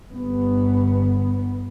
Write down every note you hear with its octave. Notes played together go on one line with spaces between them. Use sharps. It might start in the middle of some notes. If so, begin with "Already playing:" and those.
G1 B3